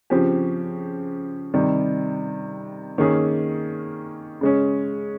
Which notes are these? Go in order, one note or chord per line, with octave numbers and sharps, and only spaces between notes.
C#3 F3 C4 G4
C3 D#3 G3
D#3 A#3 C#4 G#4
C#3 G#3 C#4